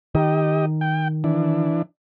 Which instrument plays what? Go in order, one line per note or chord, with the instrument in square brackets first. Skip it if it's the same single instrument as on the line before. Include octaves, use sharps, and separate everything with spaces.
[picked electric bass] D#3 [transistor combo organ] G4 D#5
[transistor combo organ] G5
E3 D4